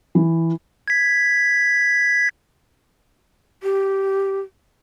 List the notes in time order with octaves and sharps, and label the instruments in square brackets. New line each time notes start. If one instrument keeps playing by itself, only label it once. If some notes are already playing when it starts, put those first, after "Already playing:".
[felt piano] E3
[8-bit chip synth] G#6 B6
[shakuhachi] G4